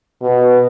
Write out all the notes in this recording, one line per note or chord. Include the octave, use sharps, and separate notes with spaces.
B2